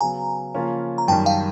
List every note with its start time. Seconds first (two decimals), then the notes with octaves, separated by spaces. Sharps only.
0.01 C#3 F#3 B3 G#5 A#5
0.55 C#3 F3 A#3 C#4 F4
0.98 A#5
1.08 F#2 D#3 G3 G5 A5
1.26 F5 G5